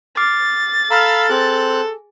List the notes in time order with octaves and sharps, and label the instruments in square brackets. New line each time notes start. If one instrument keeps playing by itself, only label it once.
[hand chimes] D6 F6 C7 [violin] A6
[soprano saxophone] A4 [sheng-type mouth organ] F5 B5 E6 [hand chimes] A#5 F6
[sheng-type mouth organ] C4 F#6 [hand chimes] G#4